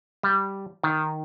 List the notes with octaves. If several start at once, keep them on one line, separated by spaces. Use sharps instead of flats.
G3
D#3